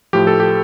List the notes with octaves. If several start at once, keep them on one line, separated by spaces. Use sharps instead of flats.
A2 F3 G4
A4
G4